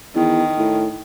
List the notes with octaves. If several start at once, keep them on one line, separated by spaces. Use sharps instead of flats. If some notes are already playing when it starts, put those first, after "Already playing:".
E2 D#3
A2